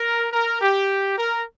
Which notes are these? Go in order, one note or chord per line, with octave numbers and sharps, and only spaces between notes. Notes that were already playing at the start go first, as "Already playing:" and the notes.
Already playing: A#4
A#4
G4
A#4